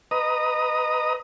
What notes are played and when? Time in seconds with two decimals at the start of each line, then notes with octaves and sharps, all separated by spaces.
0.11 B4 D#5 A#5 D#6